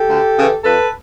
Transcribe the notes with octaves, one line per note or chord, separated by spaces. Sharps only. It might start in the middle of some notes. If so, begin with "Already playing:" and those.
Already playing: G4 A4
D2
C#3 E3
F2 A4 B4